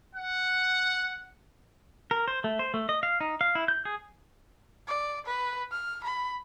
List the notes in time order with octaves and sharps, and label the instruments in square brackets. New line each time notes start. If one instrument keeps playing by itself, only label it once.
[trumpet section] F#5
[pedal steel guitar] A#4
C5
A3
C5
A3
D#5
F5
D#4
F5
E4
G6
G#4
[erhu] D5
B4
F6
B5